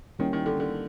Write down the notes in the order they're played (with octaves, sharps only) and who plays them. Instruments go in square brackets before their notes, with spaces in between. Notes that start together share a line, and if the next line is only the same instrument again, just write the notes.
[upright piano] D#3 [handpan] G3 A#3 C#4 E4
[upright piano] D#3
D3
D3